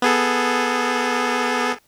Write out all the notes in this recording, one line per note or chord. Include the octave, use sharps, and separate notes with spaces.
B3 G#4 A4